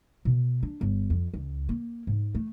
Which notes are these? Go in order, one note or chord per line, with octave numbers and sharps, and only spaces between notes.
B2
D4
G1
F2
C#2
A#3
G#2
A3